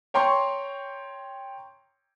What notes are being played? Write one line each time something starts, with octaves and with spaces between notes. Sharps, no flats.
C#5 G5 A#5 C6 C#6